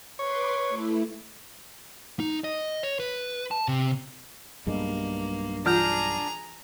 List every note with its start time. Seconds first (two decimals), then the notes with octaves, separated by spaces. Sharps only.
0.19 B4 C#5 C6 D6
0.69 A3 E4
2.20 D#4
2.44 D#5
2.83 C#5
3.00 B4
3.51 A5
3.68 C3
4.67 B1 G2 G#3 A#3
5.66 E3 D4 F4 G#4 F#5 A#5 F6 G6